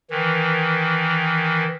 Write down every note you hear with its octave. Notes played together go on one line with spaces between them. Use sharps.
D#3 E3